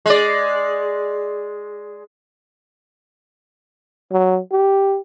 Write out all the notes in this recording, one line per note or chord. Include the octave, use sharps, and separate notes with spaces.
G#3 D5
F#3
G4